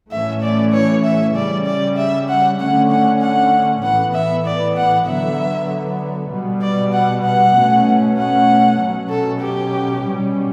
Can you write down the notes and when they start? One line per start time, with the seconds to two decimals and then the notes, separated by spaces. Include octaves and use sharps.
0.11 A2 E3 A3 C#4 E5
0.43 D5
0.73 C#5
1.05 E5
1.36 C#3 G3 C#4 D5
1.66 D5
1.97 E5
2.29 F#5
2.59 D3 A3 C#4 F#5
2.91 F#5
3.21 F#5
3.83 A2 E3 B3 F#5
4.14 E5
4.46 D5
4.77 F#5
5.07 D3 F#3 B3 E5
6.31 B2 G3 B3
6.62 D5
6.93 F#5
7.24 F#5
7.55 B2 A3 C#4
8.18 F#5
8.79 B2 F#3 C#4
9.10 A4
9.41 G4
10.04 B2 G3 C#4